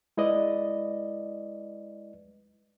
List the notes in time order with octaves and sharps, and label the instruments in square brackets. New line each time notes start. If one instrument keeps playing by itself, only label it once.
[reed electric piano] G#3 E4 B4 D5 D#5